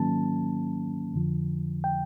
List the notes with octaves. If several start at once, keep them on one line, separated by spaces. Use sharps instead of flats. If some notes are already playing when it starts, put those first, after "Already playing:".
Already playing: G#2 D#3 F#3 A#3 C#4 A5
F2 D3 F3
G5